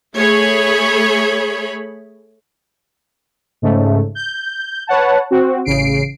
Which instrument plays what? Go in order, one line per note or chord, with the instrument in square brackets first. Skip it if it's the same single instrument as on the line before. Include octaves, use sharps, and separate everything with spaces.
[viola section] A3 G#4 C#5 B5
[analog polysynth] G#2 C#3 A3
G6
B4 C#5 F#5 A5
C4 F#4
A1 C#3 C7 D7